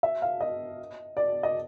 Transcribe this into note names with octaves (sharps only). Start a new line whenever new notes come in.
E5
F5
D#5
D5
D#5